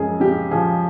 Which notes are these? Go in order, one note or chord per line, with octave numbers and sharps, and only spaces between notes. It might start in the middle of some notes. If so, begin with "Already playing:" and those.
Already playing: F#2 F3 G#3 G#4
C#3 G4
F3 G#4